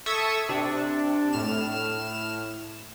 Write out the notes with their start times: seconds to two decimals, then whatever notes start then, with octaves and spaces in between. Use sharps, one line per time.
0.06 A4 E5 C#6 D#6 E6 G#6
0.49 C3 D4
1.33 A2 F6 E7